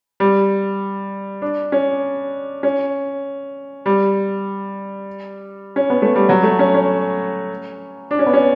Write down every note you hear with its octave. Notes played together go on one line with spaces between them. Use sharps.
G3
D4
C#4
C#4
G3
C#4
B3
A3
G3
F#3
A3
C#4
C#4
D4
C#4
B3
C#4